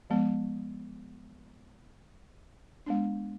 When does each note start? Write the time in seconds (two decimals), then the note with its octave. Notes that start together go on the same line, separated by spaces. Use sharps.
0.10 F3 G#3 B3
2.86 G#3 B3 D4